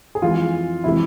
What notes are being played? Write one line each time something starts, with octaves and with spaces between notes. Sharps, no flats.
G#4
F2 E3 G#3 F4
C3 E3 G#3 E4